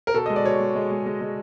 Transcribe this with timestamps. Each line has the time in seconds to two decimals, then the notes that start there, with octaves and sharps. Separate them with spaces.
0.07 A#4
0.14 B2 A4
0.26 G#3 D#5
0.36 D5
0.44 B2 C#5
0.60 G#3
0.75 G#3
0.91 G#3
1.06 G#3
1.21 G#3